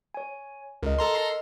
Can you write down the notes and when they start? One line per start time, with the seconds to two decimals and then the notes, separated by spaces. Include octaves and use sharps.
0.14 C#5 G#5
0.83 C#2 A#4 D#5
0.99 A4 A#5 C6